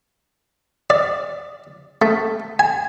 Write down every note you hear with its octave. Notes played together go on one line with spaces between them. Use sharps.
D5
A3
G#5